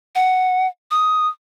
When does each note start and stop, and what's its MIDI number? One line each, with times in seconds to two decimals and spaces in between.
0.15 0.67 78
0.91 1.28 87